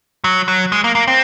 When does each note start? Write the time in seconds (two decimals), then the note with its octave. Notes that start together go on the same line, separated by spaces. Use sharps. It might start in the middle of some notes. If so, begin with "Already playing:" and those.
0.24 F#3
0.48 F#3
0.72 G#3
0.84 A#3
0.95 A#3
1.08 C4